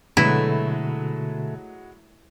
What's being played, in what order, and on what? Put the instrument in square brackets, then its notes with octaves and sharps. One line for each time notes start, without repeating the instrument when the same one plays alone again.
[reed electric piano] B2 D3 F#4 [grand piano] F#3 G#3 B4 [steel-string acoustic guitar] A3 [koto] E4